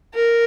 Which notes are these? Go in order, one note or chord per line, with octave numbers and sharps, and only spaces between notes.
A#4